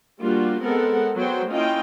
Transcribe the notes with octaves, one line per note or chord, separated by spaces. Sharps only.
G3 A#3 D4 F4 F#4
G#3 B3 C4 A4 A#4 F#5
F#3 B3 C5 G5
A#3 C#4 E4 F4 D#5 G5